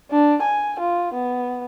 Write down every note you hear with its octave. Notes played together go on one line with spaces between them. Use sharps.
D4
G#5
F4
B3